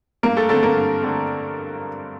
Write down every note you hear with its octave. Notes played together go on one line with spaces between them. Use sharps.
G2 A#3 A#4
A3 A4
D3 A3 C4 A4
A#3 A#4
G2
D3 A3 C4